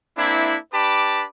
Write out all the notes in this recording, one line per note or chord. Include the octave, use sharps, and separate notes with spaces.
A#3 C4 D4 E4
D4 G4 B4 A5 B5 D6